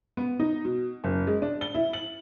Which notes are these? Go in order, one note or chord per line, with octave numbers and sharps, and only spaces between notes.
B3
D#4
B2
F#1
G#3
D4
G7
E4
F#7